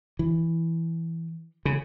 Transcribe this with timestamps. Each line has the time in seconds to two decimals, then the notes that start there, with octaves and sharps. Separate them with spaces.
0.19 E3
1.65 C#3